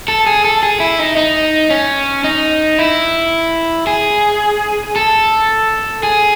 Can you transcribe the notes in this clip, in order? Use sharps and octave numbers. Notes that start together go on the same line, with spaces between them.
A4
G#4
A4
G#4
E4
D#4
D#4
C#4
D#4
E4
G#4
A4
G#4